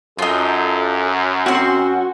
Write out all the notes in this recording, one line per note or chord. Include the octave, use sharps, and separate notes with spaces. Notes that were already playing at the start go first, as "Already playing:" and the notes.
F#2 D#4 F4 A4
C4 C#4 F#4 C6